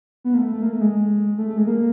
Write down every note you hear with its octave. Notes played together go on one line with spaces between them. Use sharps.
B3
A#3
A3
A3
A#3
A3
G#3
A3
A3
G#3
A#3